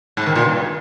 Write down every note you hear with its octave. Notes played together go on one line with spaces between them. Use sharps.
G#2
D#3
A#2
G2